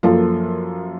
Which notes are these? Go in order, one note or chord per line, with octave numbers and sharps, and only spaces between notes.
F#2 F3 A#3 F4 A4